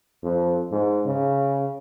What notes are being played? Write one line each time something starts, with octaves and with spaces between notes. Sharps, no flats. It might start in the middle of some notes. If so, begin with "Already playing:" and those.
F2
G#2
C#3